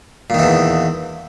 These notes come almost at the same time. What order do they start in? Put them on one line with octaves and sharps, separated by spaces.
A#2 D#3 E3 E2